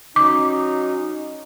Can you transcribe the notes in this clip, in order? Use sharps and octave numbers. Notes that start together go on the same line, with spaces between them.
F#3 C#4 D#4 D6